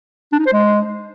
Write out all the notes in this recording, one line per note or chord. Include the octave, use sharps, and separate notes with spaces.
D4
D#4
C5
G#3